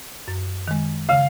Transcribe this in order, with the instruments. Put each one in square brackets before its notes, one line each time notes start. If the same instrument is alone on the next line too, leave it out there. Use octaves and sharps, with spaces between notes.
[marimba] F#2
D#3 G#3
[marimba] C#3 [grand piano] F5